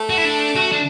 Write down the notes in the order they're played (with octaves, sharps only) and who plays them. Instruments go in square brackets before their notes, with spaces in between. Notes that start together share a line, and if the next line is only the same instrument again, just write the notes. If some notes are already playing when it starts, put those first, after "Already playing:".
Already playing: [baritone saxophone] A3
[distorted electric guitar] F#4
E4
D4
F#4
D4